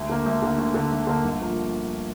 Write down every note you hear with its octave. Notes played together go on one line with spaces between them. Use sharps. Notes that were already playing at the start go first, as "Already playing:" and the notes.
Already playing: D2
D3 A#3
D2
D3 A#3
D2
D3 A#3
D2
D3 A#3
G1
F3 A#3